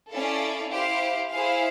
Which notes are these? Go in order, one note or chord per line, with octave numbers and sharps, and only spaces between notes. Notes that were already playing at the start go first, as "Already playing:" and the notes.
C#4 E4 A4 D5 F5
E4 G4 C5 F5
E4 G#4 C5 F5